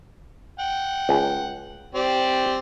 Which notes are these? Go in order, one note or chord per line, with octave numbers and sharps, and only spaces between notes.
F#5 G5
C#2
C4 G4 D5